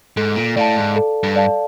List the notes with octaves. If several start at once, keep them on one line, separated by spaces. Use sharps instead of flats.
G#2 A4
A#2
A2 D5 F5 A5
G#2
A4
G2
D5 F5 A5